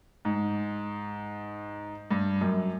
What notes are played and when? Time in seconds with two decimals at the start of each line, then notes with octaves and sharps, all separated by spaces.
0.25 G#2
2.11 G2
2.41 F#2